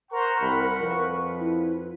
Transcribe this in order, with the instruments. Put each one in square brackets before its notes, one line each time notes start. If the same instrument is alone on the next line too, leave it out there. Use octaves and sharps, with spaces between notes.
[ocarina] A#4 [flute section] C5 A#5 C6 [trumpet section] F#5 C#6
[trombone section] C2 [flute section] B5
[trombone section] F2 F3 [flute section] B4
[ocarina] E4